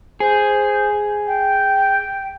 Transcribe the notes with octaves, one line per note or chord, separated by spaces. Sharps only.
G#4 C5
G5